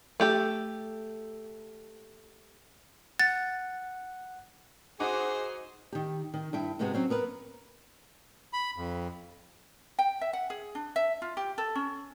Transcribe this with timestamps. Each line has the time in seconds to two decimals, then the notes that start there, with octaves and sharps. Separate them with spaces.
0.20 A3 G4 A4
3.19 F#5 A6
5.00 D#4 F#4 G#4 C5 D6
5.92 D#3 G4
6.34 D#3
6.53 G2 E4 G5
6.79 G#2 C3 G#3 B3 F#4
6.94 F#3 C4 C#4
7.10 B3 A#4 B4
8.53 B5
8.76 F2
9.99 G5
10.21 E5
10.33 F#5
10.50 G#4
10.75 D4
10.96 E5
11.22 F4
11.37 G4
11.58 A4
11.75 C#4